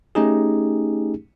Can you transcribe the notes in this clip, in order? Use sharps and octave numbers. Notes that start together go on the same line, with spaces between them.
A3 C#4 D#4 G4 G#4